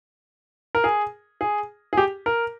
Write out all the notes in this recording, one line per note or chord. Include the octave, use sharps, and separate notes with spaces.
A#4
G#4
G#4
G#4
G4
A#4